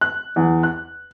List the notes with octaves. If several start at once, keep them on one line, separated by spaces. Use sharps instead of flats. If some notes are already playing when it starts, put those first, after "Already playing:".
F#6
E2
F#6